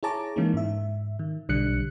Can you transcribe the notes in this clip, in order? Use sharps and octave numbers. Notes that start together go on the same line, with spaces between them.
E4 G#4 C#5 A5 A#5 D6
E3 G#3 A#3 C#4 D#4
G#2 E5
D#3
B1 D3 G3 D4 F#6 C#7